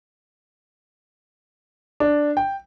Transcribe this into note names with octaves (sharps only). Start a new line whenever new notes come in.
D4
G5